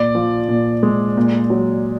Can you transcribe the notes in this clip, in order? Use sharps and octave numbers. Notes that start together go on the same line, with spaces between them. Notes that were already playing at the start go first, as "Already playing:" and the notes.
Already playing: A#2 D5
F3
A#2
G#3
A#2
F#3